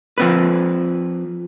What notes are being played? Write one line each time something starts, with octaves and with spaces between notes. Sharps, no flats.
F3 C4 B4